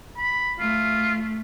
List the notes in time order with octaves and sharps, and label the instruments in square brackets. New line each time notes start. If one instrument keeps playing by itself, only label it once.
[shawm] B5
[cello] A3 [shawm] F4